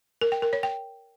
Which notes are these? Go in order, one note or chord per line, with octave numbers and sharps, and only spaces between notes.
A#4
G5
A#4
C#5
G5